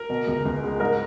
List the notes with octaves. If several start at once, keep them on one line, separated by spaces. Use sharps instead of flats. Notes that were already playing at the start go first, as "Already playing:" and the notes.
Already playing: A#4
B2
C#2
C#2
G#3
G#2 A#4